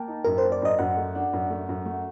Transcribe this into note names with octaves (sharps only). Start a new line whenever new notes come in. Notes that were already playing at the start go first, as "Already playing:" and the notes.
Already playing: A#3 G5 A5
D#4
F#2 A#4
C5
A#3
D5
F#2 D#5
F#2 F#5
A3
D4
F#2
A3
F#2
A3